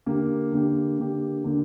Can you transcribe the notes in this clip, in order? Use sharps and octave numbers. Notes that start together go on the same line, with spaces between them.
D3 A#3 G4
D3 A#3 G4
D3 A#3 G4
D3 A#3 G4